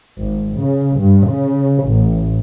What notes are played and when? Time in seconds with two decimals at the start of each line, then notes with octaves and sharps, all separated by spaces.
0.19 G#1
0.58 C#3
1.00 G2
1.28 C#3
1.86 A1